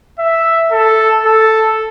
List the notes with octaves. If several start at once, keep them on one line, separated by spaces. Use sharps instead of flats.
E5
A4
A4